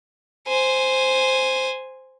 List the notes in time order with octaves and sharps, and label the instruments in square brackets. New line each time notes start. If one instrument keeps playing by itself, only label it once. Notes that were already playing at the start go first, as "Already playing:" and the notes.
[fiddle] C5 G#5